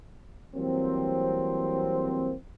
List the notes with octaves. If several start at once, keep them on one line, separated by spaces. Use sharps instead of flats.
E3 F#3 G3 A#3 C4